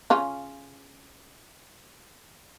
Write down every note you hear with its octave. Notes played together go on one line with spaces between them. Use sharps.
C#3 C#4 F4